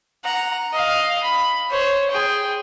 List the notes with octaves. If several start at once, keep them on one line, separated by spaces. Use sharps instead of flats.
F#5 A#5
D#5 F5
B5
C5 C#5
G#4 G5